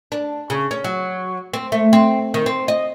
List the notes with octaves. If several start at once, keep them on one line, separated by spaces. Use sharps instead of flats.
D4
C#3
C#4
F#3
C4
A3
C4
D#3
C4
D#5